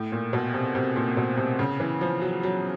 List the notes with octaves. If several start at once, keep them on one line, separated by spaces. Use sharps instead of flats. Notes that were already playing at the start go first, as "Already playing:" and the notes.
Already playing: A2
A#2
B2
C3
C3
A#2
B2
C3
C#3
E3
F3
F#3
F#3